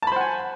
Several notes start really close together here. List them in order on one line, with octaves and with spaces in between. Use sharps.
A5 B5 C5 F#5 G#5